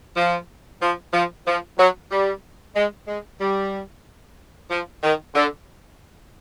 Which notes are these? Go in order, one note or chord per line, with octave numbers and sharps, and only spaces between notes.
F3
F3
F3
F3
F#3
G3
G#3
G#3
G3
F3
D#3
D3